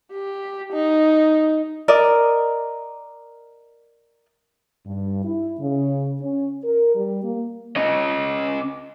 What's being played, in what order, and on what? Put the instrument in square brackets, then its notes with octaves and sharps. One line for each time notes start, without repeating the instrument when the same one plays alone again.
[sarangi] G4
D#4
[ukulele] A#4 D5 D#5
[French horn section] G2
E4
C#3
C#4
A#4
G3
A#3
[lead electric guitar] C#4 D#5